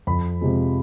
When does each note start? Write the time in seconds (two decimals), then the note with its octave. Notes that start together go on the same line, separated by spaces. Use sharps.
0.07 F2 B5
0.41 C3 F3 G#3